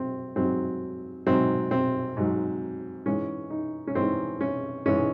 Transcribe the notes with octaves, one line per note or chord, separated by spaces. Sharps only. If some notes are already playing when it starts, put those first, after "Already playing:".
Already playing: F#3 C4
G#2 F#3 C4
G#2 F#3 C4
C4
G#2 F#3
G#2 E3 G#3 C#4
D#4
C#4
G#2 E3 G#3 C4
C#4
G#2 E3 G#3 C#4